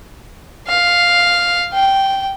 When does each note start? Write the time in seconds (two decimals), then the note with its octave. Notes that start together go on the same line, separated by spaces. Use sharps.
0.67 F5
1.73 G5